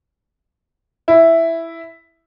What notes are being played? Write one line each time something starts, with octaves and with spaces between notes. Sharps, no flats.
E4